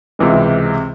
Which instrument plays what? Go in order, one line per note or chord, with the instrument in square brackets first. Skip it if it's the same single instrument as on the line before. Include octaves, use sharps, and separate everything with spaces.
[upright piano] C#2 C3 E3 G#3